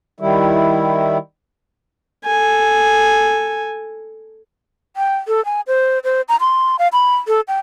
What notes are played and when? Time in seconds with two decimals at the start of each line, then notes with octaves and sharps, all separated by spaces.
0.20 D#3 G3 E4
2.25 A4 G#5
4.97 G5
5.28 A4
5.45 G#5
5.67 C5
6.04 C5
6.29 A#5
6.40 C6
6.79 F5
6.93 B5
7.27 A4
7.48 G5